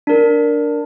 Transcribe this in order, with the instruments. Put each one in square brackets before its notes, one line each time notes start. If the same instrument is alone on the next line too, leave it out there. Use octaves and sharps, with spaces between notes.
[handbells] D4 A#4